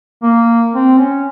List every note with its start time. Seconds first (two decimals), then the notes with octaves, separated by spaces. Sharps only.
0.23 A#3
0.74 C4
0.99 C#4